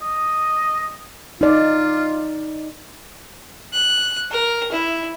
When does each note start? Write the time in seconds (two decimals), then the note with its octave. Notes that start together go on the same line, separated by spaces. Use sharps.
0.02 D#5
1.41 D#4 F4 D5
3.73 F#6
4.31 A#4
4.72 E4